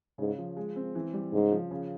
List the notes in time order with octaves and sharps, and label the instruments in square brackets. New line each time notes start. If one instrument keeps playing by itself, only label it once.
[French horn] G#2 [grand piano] C#3
[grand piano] F3
G#3
C4
E3
G3
[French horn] G#2 [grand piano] C#3
[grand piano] F3
C#3